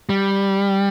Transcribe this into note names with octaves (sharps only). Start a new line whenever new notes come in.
G3